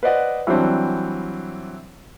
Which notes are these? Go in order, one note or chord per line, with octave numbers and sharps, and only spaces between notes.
B4 C5 D5 D#5 F#5
E3 F#3 G3 C4 D4